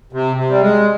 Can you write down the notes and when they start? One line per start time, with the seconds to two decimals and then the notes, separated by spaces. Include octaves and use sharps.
0.13 C3
0.37 C3
0.50 G3
0.61 G#3